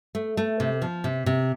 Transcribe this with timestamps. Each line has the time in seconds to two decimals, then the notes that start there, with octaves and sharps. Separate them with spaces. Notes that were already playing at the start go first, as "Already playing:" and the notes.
0.15 A3
0.37 A3
0.60 C3
0.82 F3
1.04 C3
1.26 C3